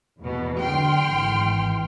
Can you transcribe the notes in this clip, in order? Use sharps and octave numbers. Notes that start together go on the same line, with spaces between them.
E2 B2
D3 F#3 G5 C6 F6
G#1 G#2 E3